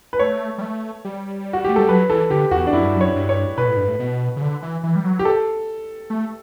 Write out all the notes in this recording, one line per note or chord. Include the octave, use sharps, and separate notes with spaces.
B4
A3 C#5
G3
A3
G3
F#4
A3 G4
G3 A4
F#3 B4
E3 A4
D3 G4
E2 F#4
D4
F#2 E4
G2
F#2
C#5
G2
C#5
B2 B4
A2
G2
A2
B2
C#3
D3
E3
E3
G3
F#3
G4
A4
A3